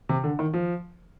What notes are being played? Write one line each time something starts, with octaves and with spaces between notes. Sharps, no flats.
C3
D3
D#3
F3